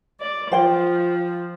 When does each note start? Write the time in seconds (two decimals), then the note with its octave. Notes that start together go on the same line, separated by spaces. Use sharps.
0.18 D5
0.52 F3 C5 G5